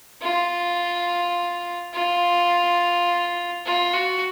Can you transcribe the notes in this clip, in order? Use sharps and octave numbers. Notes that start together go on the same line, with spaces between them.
F4
F4
F4
F#4